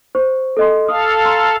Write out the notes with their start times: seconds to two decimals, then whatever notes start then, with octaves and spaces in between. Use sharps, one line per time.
0.15 C5 C#6
0.57 A4 D#5 C6
0.88 A4 F5 D#6
1.25 A#5 C6